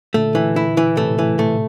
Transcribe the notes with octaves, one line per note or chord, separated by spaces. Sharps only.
A#2 D3 A3
E3
E4
E3
A2 C3 A3
E3
A3